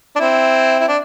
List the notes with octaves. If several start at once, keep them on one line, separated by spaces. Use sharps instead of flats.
D4
C4 E4
E4
D4